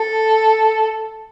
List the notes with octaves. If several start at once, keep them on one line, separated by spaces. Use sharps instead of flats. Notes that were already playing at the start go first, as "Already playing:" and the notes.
Already playing: A4